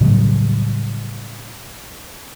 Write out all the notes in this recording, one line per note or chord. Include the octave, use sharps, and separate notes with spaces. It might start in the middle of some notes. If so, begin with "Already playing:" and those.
A2 C#3 F#3 G3